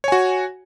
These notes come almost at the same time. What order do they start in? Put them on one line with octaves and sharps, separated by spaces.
C#5 G#5 F#4